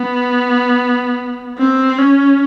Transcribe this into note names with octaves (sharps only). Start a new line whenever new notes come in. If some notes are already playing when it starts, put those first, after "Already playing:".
Already playing: B3
C4
C#4